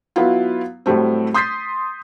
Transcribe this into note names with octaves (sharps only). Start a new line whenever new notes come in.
F#3 B3 E4 F4
A2 F#3 G3 A3 C4
C6 D#6 G6 A6 B6 C7